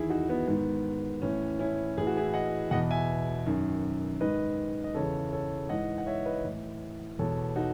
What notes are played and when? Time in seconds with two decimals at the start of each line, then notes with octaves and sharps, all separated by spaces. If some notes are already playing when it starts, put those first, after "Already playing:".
Already playing: E2 D#3 E4 G#4
0.10 D#4 F#4
0.29 B3 D#4
0.48 G#2 D#3 B3
1.22 A2 E3 C#4
1.59 C#4 E4
1.98 A2 E3 G#4
2.07 F#4
2.17 E4 G#4
2.34 D#5 F#5
2.71 E2 B2 D#5 F#5
2.91 E5 G#5
3.46 F#2 D#3
4.20 G#2 D#3 B4 D#5
4.84 D#5
4.95 E2 C#3 E3 A4 C#5
5.32 A4 C#5
5.69 G#2 E3 D#5 F#5
5.98 F#5
6.06 C#5 E5
6.26 B4 D#5
6.45 A2 E3
7.19 E2 B2 A4 C#5
7.56 D#4 F#4